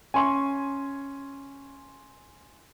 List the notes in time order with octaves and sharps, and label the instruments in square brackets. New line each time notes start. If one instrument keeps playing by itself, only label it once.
[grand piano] C#4 C#6 [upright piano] G#5 C6